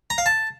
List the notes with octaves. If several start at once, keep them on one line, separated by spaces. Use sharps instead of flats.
A#5
F5
A5